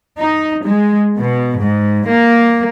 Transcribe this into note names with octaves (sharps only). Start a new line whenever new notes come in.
D#4
G#3
B2
G#2
A#3